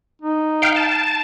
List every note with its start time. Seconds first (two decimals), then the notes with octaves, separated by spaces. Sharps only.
0.22 D#4
0.62 F5 G5
0.76 A5